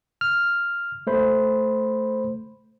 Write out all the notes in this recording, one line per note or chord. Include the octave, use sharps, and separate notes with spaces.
F6
A3 C5 B5